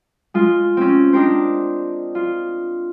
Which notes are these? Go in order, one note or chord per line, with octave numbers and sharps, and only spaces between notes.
G#3 F4
C4 C#4
D4 D#4 G4 A#4 C5
F4